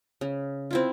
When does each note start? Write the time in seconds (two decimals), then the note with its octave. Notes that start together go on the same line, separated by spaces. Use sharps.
0.21 C#3
0.71 C4 E4 F4